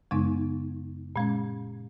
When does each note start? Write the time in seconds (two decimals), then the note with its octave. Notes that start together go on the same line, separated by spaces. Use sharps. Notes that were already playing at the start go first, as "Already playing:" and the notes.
0.11 F#2 C#3 G#3 B3 D#4
1.16 A#2 G#3 C#4